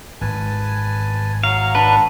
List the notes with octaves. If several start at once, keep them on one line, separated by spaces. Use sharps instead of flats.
G#1 B4 G#5 A5
F#3 F5 A#5 C#6
D4 B4 A5